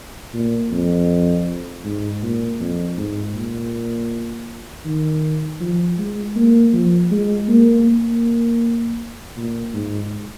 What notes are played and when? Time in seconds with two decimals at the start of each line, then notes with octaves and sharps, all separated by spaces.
0.34 A#2
0.71 F2
1.84 G#2
2.22 A#2
2.60 F2
2.97 G#2
3.34 A#2
4.85 D#3
5.60 F3
5.98 G#3
6.36 A#3
6.73 F3
7.11 G#3
7.48 A#3
7.86 A#3
9.36 A#2
9.73 G#2